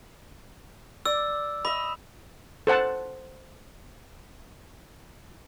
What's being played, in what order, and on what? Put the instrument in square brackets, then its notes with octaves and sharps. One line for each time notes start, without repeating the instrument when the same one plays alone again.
[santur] D5 [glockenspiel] E6
[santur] D#5 E5 [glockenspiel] B5
[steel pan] A4 C5 F#5 A5